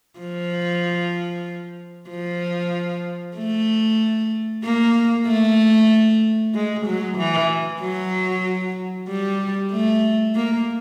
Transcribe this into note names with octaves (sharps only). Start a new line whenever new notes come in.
F3
F3
A3
A#3
A3
G#3
F#3
E3
F#3
G3
A3
A#3